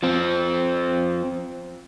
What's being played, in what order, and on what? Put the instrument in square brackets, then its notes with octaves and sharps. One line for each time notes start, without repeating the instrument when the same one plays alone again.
[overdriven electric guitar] F3 C4